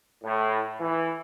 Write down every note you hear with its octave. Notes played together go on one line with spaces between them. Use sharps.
A2
E3